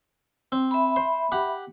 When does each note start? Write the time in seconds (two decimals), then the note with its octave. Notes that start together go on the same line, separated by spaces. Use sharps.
0.52 C4
0.71 E5 B5
0.96 C5
1.32 G4 F#5